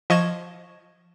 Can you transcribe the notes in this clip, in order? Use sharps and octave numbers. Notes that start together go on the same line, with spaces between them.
F3 D#5 C#6 G#6 E7